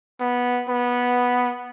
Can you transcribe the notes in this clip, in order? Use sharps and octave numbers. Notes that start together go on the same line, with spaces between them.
B3
B3